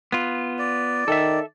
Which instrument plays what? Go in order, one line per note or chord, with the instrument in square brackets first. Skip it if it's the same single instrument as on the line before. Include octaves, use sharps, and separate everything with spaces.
[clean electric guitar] B3 F4
[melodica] D5
[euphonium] D#3 [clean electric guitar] A4 E5